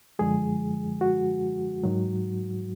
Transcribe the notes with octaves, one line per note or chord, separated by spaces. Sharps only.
F#2 D3 F3 G#3 G#4
F#4
G#2 D#3 F#3